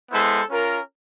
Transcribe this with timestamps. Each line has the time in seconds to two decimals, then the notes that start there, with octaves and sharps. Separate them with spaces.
0.12 G#3 B3 E4 A4 C5
0.50 C#4 F4 A#4